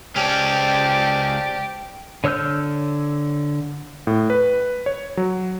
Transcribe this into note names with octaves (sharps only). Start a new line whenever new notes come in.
C#2 C#4 G4 C5 D5 A5
D3 C#5 E6 F6 G6
A2
B4
C#5
F#3